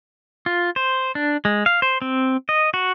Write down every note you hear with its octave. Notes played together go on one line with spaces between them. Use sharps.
F4
C5
D4
G#3
F5
C5
C4
D#5
F#4